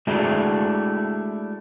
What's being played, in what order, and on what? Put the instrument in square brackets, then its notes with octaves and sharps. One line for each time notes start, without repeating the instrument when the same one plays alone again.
[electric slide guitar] G#3 A3 D4 E4 F#4 G#4